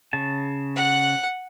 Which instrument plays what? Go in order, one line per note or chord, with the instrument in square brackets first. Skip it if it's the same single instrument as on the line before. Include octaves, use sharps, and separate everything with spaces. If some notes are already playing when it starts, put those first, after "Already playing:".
[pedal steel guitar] C#3 A5
[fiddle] F#5 F#6